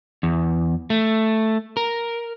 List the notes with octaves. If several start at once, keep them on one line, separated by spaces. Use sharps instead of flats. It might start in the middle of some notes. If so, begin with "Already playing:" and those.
E2
A3
A#4